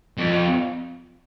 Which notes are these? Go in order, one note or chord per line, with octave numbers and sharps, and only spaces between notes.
F2